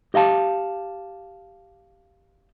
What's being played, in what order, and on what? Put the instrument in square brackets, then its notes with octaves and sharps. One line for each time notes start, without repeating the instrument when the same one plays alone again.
[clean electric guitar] G4 D#5 F5 A5